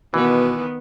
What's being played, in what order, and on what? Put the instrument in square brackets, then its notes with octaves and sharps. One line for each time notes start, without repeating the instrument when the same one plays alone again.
[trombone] B2 [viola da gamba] D#3 B3 [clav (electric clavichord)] E3